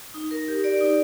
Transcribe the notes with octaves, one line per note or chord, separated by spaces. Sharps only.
D#4
A#4
G4
D5
D#4